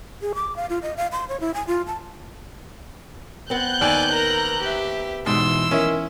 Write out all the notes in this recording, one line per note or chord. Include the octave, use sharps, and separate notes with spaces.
G#4
D6
F5
F4
D#5
F5
C6
C#5
E4
G#5
F4
A5
B3 C4 F#6 G6
D#2 D5 G#5
A#4 A#5
G4 E5
G#2 B2 E3 C6 E6
D#3 C#4 E4